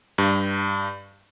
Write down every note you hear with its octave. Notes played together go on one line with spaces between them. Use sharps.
G2